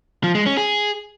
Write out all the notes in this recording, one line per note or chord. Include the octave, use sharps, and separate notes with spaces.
F3
G#3
C#4
G#4